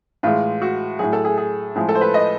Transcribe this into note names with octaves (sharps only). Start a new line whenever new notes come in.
A2 E3 G#3 F4
F#4
A2 F#3 G#4
A4
G#4
G#4
A2 F3 G#3 G#4
A4
C5
B4
D#5